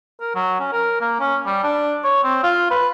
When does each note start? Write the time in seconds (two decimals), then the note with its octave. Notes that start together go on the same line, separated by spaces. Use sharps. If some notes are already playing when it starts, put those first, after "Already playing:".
0.20 A#4
0.35 F#3
0.60 C#4
0.72 A#4
1.01 A#3
1.20 C#4
1.46 G3
1.64 D4
2.04 C#5
2.24 C4
2.43 F4
2.71 B4